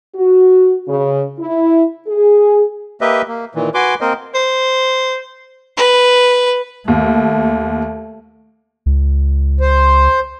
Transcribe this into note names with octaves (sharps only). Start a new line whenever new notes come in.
F#4
C#3
E4
G#4
A#3 G4 B4 D#5 E5
A#3
A#2 D#3 E3
F#4 B4 G#5 C6 D6
A#3 C4 A#4 C5 D#5
C5
B4
D#2 A3
C#2
C5